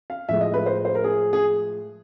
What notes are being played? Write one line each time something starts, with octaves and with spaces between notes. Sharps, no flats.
F5
A2 F3 G#3 E5
D#5
B4
C5
C5
A#4
G#4
G#4